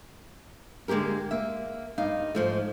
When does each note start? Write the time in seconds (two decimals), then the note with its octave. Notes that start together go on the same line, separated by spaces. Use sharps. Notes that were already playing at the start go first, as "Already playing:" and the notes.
0.88 D3 G#3 A#3 G4 A#4
1.31 A#3 E5
1.98 G2 D#4 F5
2.35 G#2 F3 A3